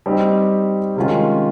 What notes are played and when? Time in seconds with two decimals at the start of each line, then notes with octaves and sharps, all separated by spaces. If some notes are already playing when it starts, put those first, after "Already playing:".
0.06 G3 C4 D#4 G4
0.96 C3 D#3 G#3 C#4 F4